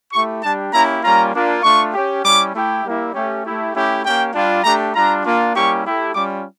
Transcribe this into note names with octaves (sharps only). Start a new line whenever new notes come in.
A3 E4 G4 C#6
G3 D4 G4 A5
A#3 C#4 E4 G4 A#5
G3 A#3 C#4 F4 A#5
A#3 D4 F4
A3 D4 F4 C#6
C#4 G4
G3 C#4 E4 D6
A3 E4 G4
G3 A#3 E4
A3 C#4 G4
A3 E4 G4
A3 C#4 E4 G4
A#3 C#4 G4 G5
G3 D4 F4
A3 D4 G4 A#5
G3 D4 F4 A#5
A#3 D4 F4
G3 A#3 C#4 E4 G4 C#6
A3 E4 G4
G3 C#4 F4 D6